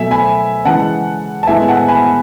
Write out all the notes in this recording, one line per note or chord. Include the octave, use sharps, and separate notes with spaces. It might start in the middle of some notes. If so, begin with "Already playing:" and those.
Already playing: B2 F#3 A3 E5 G#5
G#5 B5
C#3 E3 G#3 F#5 A5
A5
A2 G#3 B3 E5 G#5
F#5 A5
G#5 B5